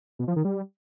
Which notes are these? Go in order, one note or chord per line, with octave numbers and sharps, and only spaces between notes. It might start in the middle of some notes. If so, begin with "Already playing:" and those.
B2
F3
D#3
G3